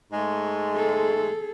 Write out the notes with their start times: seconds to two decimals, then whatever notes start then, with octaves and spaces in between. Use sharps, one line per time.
0.12 G#2 G#3 A3
0.75 G#4 A4